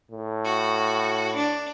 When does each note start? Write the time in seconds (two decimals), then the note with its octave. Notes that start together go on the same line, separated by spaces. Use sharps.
0.11 A2
0.45 F#4
1.35 D4